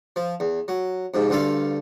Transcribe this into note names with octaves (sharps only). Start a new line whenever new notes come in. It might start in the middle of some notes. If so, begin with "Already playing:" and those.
F3
E2
F#3
F2 G#2 C3
D2 G2 F4 A4 F5